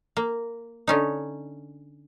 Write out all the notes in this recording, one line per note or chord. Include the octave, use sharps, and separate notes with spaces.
A#3
D3 C#4 D#4